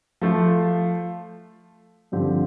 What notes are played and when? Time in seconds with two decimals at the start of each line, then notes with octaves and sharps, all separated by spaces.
0.21 F3 A3 F4
2.12 G2 D3 F3 C4 G4